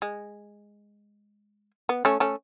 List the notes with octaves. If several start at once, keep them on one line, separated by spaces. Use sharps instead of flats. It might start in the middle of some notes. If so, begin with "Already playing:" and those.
G#3
B3
A3 C#4
A3 C#4